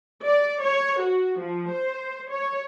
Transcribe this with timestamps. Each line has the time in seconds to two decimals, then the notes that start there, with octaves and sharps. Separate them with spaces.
0.24 D5
0.62 C#5
1.01 F#4
1.39 F3
1.69 C5
2.29 C#5